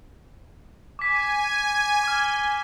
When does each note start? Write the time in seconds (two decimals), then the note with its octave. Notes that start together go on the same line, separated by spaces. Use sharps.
0.99 G#5 D6 B6
2.04 D6 F6